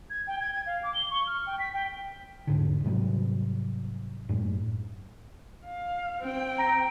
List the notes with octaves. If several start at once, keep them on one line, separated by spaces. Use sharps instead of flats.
G#6
G5
G#6
G#6
F5
D6
G7
C#6
F6
G5
B6
G5
E1 D2 G#2 D3
G#2 C3 F#3 G3
F#2 A2 G#3
F5
C4 G5
A#5 A#6 D7